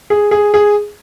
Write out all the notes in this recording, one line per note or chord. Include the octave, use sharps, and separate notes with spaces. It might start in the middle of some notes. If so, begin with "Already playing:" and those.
G#4
G#4
G#4